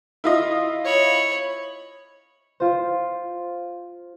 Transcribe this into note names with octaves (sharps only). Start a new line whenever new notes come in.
E4 F4 D#5
C#5 B5
F4 C5